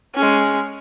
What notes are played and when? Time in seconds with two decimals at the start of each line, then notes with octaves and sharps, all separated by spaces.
0.15 G#3 C#4